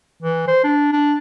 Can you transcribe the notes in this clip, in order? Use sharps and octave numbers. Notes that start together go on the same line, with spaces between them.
E3
C5
D4
D4